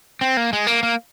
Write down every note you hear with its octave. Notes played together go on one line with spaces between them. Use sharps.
C4
A#3
G#3
A#3
A#3